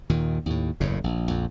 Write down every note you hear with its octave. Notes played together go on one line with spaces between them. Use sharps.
D#2 A#2 D#3
D#2 A2
F#1 E2 A2 C#3
A#1
A#1 F2